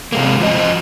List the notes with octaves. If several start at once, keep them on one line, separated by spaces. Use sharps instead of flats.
C3 G#3 A#3
F3 F#4 D#5